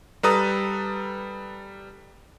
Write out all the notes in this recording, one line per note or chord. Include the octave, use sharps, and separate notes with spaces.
G3 A4 B4 A#5 D#6